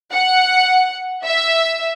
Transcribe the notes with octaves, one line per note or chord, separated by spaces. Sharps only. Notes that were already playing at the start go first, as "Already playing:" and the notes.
F#5
E5